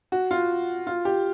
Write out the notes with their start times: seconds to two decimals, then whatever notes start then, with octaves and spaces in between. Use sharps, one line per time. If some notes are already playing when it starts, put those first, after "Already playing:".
0.12 F#4
0.31 F4
0.87 F4
1.05 G4